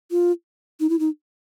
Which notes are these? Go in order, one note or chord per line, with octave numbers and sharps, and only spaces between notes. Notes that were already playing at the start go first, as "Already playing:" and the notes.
F4
D#4
E4
D#4